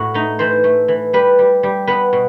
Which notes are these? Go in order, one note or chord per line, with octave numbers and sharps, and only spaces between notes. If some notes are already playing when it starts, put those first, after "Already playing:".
Already playing: A2 F#4
A3 D#4
E3 C5
A3
E3
G3 B4
G3
G3
B3 B4
B2